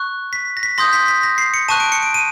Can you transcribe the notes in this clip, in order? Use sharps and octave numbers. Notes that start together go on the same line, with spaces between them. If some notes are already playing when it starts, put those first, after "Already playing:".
Already playing: C#6 F#6
B6
A#6
B6
C6 D#6 G6 A#6
B6
B6
A#6
C7
C#7
A5 C#6 F#6 D#7
D7
C#7
D7
D#7